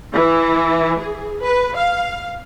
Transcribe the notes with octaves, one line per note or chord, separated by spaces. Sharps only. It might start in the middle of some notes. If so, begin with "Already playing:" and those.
E3
G#4
B4
F5